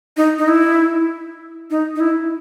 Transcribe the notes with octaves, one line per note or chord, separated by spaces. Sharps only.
D#4
D#4
E4
D#4
D#4
E4